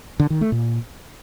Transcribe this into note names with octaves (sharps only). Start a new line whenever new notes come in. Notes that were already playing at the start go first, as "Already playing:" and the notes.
D3
D#3
A3
A#2